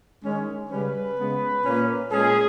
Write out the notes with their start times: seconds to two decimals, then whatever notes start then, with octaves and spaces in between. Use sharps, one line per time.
0.23 D#3 G#3 C#4
0.70 C#3 G3 C#4 B4
1.17 C#3 G#3 B3
1.65 A#2 A#3 C#4
2.12 A#2 G#3 C#4 G#4